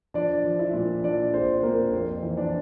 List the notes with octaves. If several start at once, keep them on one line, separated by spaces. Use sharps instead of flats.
F3 D4 D5
F3
E4 E5
A#2
F3 D4 D5
A#1 C4 C5
A#2 A#3 A#4
F2 C4 C5
E3
D4 D5